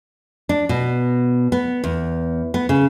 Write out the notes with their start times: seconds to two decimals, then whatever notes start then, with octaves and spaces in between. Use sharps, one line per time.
0.49 D4
0.69 B2
1.52 B3
1.84 E2
2.54 B3
2.69 C#3